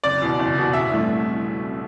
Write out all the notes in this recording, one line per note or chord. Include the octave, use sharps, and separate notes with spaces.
F#1 D5
E2 B2
F#1
E2 B2
A1 E5
G2 E3 A3 E4